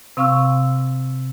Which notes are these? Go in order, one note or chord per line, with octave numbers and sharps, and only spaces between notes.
C3 C4 F5 C#6 E6 F6